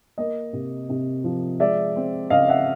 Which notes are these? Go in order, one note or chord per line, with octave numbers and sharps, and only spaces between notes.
A#3 D#5
C3
C3
F3
G#3 D5 E5
C4
C#3 D#5 F5
E5 F#5